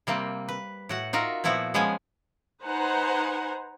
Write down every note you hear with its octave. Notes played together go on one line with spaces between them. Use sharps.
C3 G3 A#3 C4
B4
A2 F#4 F#5
D#4 F4 F#4 A#4 E5
A#2 F3 B3 E4 F#4
F3 G#3 B3 C#4 G#5
D#4 B4 C5 F#5 G#5 A#5